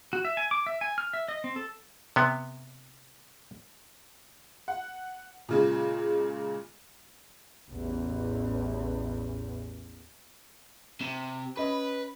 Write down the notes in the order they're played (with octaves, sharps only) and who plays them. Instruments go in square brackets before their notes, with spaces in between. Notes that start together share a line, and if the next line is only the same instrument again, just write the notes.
[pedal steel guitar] F#4
E5
G#5
D6
E5
G#5
F6
E5
D#5
C4
A4
[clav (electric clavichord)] C3 B3
[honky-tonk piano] F#5
A#2 C#3 G#3
[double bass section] A1 E2
[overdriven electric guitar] C3 [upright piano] E7
[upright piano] C#4 D#5 B5 [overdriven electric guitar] B4